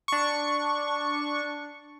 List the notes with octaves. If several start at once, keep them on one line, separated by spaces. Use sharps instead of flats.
D4 C#6